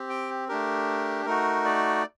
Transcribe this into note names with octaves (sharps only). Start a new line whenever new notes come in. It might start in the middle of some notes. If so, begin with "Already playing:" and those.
Already playing: C4 G4
G5
A3 D4 G4 A#4
A3 D#4 F#4 A#4
D5